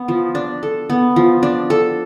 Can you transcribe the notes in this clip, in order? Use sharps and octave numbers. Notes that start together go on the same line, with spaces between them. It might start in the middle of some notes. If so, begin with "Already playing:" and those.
Already playing: B3
F3
D4
A4
B3
F3
D4
A4